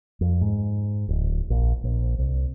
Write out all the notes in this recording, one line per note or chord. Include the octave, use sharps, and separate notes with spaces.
F2
G#2
D1
A#1
A#1
C2